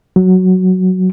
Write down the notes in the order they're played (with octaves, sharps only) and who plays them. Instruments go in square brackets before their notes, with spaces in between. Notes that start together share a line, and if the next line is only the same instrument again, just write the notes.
[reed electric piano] F#3